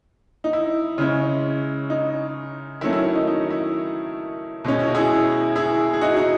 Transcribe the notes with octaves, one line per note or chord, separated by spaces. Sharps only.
D#4
E4
C#3 G#3 C#4
D#4
D#3 F#3 A3 C#4 E4
E4
E4
D#4
D#4
E4
B2 G#3 C#4
E4
F#4
E4 G#4
E4 G#4
G#4
D#4 F#4
D#4